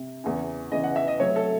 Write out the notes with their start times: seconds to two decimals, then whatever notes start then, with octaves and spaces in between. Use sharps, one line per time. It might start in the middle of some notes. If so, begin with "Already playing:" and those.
Already playing: C3
0.24 E2 C#3 E3
0.72 E2 C#3 E3 D#5
0.84 F#5
0.96 E5
1.08 D#5
1.20 C3 F#3 A3 C#5
1.36 A4